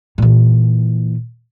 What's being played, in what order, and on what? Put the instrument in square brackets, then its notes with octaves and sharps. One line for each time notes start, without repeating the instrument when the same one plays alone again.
[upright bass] A#2 E3